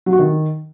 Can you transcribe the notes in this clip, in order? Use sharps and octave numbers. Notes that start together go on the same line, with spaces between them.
F#3
F#4
D#3